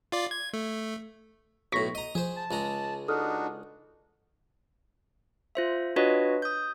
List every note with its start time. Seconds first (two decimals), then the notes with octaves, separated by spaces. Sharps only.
0.12 F4 D5
0.31 G#6
0.53 A3
1.72 B1 A2 C#6 A#6 B6
1.95 D#5 A#5
2.15 F3 G#4 C5
2.36 A5
2.51 C#2 G#3 A#5
3.08 D4 D#4 F#4 A4 D#6 F6
5.55 F4 C5 E5
5.96 D4 F4 F#4 B4 C#5 D#5
6.42 D#6 G6